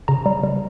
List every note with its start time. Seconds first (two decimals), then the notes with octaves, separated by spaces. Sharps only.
0.08 C#3 A#5
0.26 G3
0.44 G3